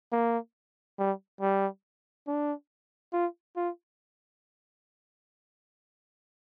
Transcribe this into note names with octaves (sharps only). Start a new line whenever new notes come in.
A#3
G3
G3
D4
F4
F4